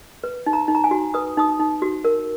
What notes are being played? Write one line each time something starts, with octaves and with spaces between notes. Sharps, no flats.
B4
D#4
A#5
D#4
A#5
G#5
F#4
B4 D#6
D#4 D#6
D#4
F#4
A#4